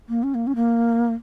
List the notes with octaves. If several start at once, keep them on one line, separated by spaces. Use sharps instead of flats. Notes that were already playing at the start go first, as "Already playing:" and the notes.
A#3
C#4
A#3
C#4
A#3